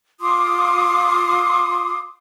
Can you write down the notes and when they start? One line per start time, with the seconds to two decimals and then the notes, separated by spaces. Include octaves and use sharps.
0.20 F4 C6 D6 D#6